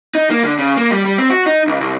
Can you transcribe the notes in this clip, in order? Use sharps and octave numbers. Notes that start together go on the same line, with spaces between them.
D#4
A#3
D3
C#3
A#3
G3
G3
C4
F#4
D#4
C#2
C2